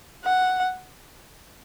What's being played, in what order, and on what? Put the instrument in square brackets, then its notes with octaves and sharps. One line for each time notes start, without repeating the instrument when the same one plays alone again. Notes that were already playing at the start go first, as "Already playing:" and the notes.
[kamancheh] F#5